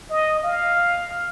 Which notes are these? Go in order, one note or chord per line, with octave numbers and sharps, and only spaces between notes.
D#5
F5